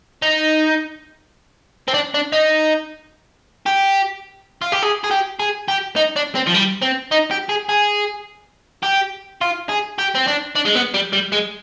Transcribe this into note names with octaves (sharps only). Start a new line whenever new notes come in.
D#4
C4
D4
D4
D#4
G4
F4
G4
G#4
G#4
G4
G#4
G4
D#4
D4
C4
F3
G3
C4
D#4
G4
G#4
G#4
G4
F4
G#4
G4
C4
D4
D4
G#3
B3
G3
G3
G#3